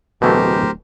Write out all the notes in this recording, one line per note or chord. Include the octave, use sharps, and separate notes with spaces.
D1 B2 E3 A3 G4 A#4 C5